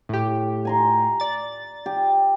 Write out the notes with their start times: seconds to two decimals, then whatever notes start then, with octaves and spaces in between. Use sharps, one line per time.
0.09 A2 G4
0.65 G#5 A#5 C6
1.20 D5 A6
1.86 G4